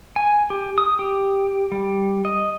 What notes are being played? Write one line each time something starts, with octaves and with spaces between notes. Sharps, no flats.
G#5
G4
D#6
G4
G3
D#5